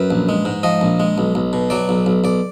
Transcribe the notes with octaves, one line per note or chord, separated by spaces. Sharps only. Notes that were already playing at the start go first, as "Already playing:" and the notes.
Already playing: F#2 B4
A#1
G#3
G#2
F3 D#5
A#1
G#3
B1
B1
B2
F#3 D5
B1
B1
B1 D5